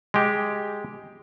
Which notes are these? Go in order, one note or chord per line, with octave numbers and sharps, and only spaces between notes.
G#3 G4